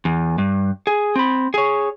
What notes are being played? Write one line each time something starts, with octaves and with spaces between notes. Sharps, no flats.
E2
G2
G#4
C4 B5
G#4 C#5